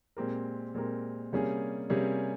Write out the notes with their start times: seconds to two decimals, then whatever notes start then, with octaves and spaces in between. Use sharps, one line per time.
0.17 A#2 G#3 C4 G4 A#4
0.74 A#2 G#3 C4 G4 A#4
1.33 C3 G3 A#3 C#4 G#4
1.90 C3 G3 A#3 C#4 G#4